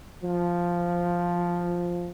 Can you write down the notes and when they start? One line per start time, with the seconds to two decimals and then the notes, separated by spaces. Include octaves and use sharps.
0.23 F3